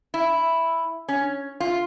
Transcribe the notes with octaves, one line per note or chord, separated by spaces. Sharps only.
E4
C#4
F4